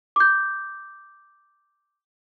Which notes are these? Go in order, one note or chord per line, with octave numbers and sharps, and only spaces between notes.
D6 G6